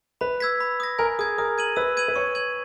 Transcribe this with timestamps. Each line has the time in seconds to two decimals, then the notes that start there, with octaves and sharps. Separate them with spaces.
0.21 B4 B5
0.40 E6 G#6 B6
0.60 B5
0.80 D#6 A#6
0.99 A#4 G#5
1.19 G#4 D#6 G#6
1.38 A#4 D#6
1.58 G#6 D#7 F#7
1.76 B4 E6
1.97 G#6 D#7 F#7
2.08 B4
2.15 C#5 C#6
2.35 G#6 D#7 F#7